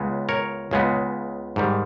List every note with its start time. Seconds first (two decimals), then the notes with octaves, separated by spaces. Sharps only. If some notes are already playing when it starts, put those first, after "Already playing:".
Already playing: C#2 C#3 G#3 B3
0.29 A#4 C#5
0.71 C#2 C#3 G#3 B3
1.56 G#2 D#3 G3